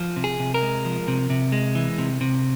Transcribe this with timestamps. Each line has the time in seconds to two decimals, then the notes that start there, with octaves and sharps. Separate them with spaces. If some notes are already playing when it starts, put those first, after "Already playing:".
Already playing: F3
0.16 C3
0.24 G#4
0.39 C3
0.54 A#4
0.62 G#3
0.85 F3
1.08 C3
1.30 C3
1.52 G#3
1.75 E3
1.98 C3
2.21 C3